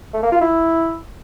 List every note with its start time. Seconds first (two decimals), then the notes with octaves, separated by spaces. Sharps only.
0.14 A3
0.23 A#3
0.32 F4
0.42 E4